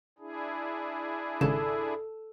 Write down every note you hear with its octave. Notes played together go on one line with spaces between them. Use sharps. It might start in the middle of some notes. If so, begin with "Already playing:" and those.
D4 E4 G#4
G#1 C#3 A4